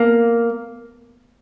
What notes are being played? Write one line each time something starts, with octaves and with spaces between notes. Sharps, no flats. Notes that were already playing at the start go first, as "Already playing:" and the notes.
Already playing: A#3